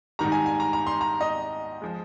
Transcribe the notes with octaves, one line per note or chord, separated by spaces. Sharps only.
G#2 D#3 G3 A#5
G#5
G#5
A#5
A#5
C6
A#5
D#5
F3 G#3